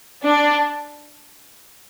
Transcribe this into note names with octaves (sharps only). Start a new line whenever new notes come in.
D4